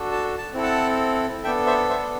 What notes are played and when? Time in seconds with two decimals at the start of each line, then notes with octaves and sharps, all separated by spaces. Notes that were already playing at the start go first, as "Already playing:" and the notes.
Already playing: D4 F#4 A4
0.12 A5
0.38 A5
0.53 C4 E4 A4
0.63 F#5 A5
1.43 B3 D4 A4 E5 G5
1.66 C5 E5
1.89 C5 E5